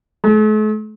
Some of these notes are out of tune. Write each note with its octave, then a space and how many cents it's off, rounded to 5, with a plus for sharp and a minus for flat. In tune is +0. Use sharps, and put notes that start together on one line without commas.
A3 -45